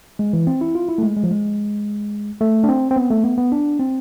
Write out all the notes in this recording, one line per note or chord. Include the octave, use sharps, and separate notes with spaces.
G#3
E3
C4
E4
F4
E4
A3
G#3
G#3
F3
G#3
A3
D4
C4
C4
B3
A3
B3
B3
D4
C4